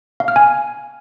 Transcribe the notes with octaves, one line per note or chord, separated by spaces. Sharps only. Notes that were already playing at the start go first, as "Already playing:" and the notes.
F5
F6
G#5